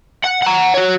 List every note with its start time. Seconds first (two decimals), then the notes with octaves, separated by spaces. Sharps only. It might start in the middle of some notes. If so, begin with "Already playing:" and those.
0.24 F#5
0.43 F#5 A#5
0.74 F#4 C#5